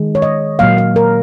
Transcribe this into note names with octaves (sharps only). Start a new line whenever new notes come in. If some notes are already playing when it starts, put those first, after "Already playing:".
Already playing: D#3 G#3
C#5
D#5
A#2 F#3 A#3 F5
F5
A#4